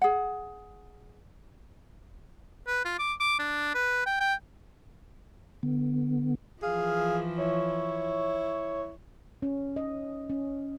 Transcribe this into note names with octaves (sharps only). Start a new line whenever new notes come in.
G#4 F#5
B4
F4
D6
D6
D4
B4
G5
G5
D3 B3
E3 F3 G#4 F5
E4 C#5
C#4
D#5
C#4